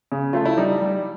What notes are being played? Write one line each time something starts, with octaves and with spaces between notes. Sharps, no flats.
C#3
A3 F4
E4
G3 D#4
G3